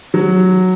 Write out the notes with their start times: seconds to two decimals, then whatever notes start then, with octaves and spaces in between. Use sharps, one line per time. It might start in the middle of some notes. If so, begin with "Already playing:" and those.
0.14 F#3